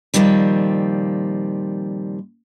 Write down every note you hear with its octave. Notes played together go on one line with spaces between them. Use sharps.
A#2 D#3 F3 G3 C4